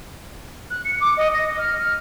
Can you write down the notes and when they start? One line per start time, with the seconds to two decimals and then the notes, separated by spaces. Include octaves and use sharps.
0.70 F#6
0.85 C#7
1.00 D6
1.17 D#5
1.34 A#6
1.58 F6
1.78 F6